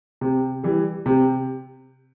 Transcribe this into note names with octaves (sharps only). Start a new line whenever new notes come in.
C3
E3 G3
C3